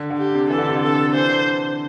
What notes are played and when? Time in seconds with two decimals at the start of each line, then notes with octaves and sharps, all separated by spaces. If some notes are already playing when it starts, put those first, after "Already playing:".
Already playing: D3
0.10 D3
0.17 G4
0.34 C3
0.50 E3 A4
0.58 D3
0.68 C3
0.75 D3
0.82 A4
1.14 E3 C5
1.29 D3